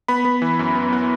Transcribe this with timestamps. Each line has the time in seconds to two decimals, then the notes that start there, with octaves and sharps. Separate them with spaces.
0.08 B3 B5
0.25 B3
0.42 E3
0.59 F#2
0.75 B3
0.93 B3